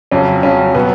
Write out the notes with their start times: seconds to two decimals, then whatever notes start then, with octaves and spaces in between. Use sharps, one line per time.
0.12 F2 C#3 F#3 C#4
0.43 F2 C#3 F#3 C#4
0.75 B2 F#3 B3